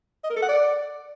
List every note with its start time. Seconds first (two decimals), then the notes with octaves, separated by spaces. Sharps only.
0.24 D#5
0.30 A#4
0.36 A4
0.42 F#5
0.49 D5